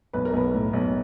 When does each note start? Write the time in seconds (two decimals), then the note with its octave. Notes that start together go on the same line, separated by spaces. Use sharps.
0.13 B1 B4
0.25 A#4
0.33 B1 B3 B4
0.54 A2
0.73 B1